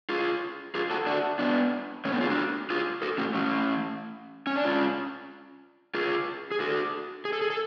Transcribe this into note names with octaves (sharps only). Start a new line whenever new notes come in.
F4 G#4
F4 G#4
F#4 A4
D4 F#4
B3 D4
A3 C#4
B3 D4
F4 G#4
D4 F#4
F4 G#4
F#4 A4
A3 C#4
A3 C#4
C#4
D4
C#4 F4
F4 G#4
G#4
F#4 A4
G#4
A4
G#4
A4